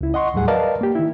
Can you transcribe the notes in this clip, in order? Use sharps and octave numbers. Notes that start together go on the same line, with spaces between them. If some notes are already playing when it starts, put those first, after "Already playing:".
C#2 E4
D#5 F#5 C6 C#6
D#2 A2 F#3 G3 G#4 F#5
A#4 B4 D5 D#5 F5 A5
A#3 G4
D#3 E4